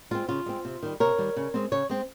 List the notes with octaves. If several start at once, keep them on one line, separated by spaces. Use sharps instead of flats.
G#3 C4 F4
C#3 F4
G#3 C4
C3
D#3 G3
C3 A#4 C#5
D#3 G3
C#3
G#3 C4
C#3 C#5
G#3 C4